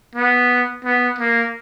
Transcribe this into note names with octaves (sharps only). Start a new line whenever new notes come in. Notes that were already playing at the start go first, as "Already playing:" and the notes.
B3
B3
A#3